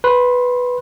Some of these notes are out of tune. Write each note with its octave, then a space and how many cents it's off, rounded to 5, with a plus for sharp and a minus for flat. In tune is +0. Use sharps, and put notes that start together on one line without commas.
B4 +0 C6 +20